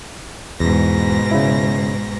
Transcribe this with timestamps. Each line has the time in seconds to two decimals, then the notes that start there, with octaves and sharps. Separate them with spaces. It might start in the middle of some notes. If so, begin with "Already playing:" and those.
0.60 E2 G#2 B2 A#6
1.31 C#3 E4